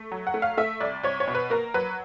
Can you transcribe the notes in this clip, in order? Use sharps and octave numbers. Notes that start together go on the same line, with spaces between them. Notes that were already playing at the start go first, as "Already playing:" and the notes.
Already playing: A3
F#3
F#5
A3
F5
A3 E5
C2 D5
C2 C#5
C#5
B2
B4
A#3 A#4
F#3 B4